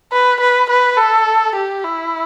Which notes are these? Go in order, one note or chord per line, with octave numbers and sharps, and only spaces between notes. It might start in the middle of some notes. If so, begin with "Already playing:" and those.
B4
B4
B4
A4
G4
E4